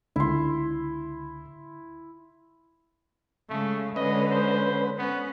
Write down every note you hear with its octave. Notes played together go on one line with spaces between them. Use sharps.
C#2 D3 E4 C6
C#3 G#3 A3
D3 G#3 C#4 B4 D#5
C5
B3 C#4